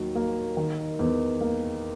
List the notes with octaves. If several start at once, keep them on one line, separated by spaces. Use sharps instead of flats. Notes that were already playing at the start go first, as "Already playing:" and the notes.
Already playing: D#2 D#3 F#3
A#3
D#3
E2
A#3